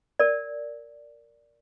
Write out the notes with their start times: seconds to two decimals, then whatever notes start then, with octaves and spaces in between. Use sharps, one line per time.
0.19 A#4 D5